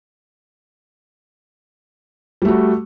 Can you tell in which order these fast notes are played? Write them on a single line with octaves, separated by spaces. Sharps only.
G3 A3 F#4